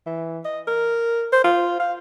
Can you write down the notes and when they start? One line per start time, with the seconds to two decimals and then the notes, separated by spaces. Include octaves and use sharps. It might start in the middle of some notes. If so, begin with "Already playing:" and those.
0.06 E3
0.45 D#5
0.67 A#4
1.32 C5
1.44 F4
1.80 F5